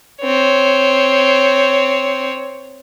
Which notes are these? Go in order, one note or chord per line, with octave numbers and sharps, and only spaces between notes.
C4 C#5